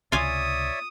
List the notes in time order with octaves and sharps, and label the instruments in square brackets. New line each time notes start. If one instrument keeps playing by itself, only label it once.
[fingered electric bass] C#2 C3 [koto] F4 G#5 [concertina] C#5 D5 E5 [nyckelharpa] D#6